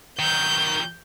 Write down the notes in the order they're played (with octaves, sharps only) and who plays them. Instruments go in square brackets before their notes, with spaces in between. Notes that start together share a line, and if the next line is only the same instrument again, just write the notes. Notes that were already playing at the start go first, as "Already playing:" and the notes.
[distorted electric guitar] D#3 F#3 [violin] G6